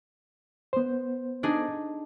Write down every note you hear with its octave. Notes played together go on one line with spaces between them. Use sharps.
B3 C5
D4 D#4 G#4